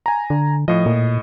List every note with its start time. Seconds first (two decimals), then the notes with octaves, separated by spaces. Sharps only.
0.06 G#5 A#5
0.30 D3
0.68 A2 F3 D#5
0.86 A#2